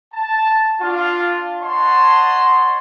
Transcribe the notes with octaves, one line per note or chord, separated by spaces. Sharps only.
A5
D4 F4
C#5 D#5 F#5 A5 C6